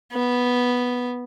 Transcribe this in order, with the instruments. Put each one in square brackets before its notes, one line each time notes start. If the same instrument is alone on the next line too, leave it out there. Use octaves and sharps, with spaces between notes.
[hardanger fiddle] B3